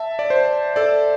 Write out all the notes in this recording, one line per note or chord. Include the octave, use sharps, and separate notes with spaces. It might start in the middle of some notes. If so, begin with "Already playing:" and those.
Already playing: E5 A5
D5
C5
A4 D5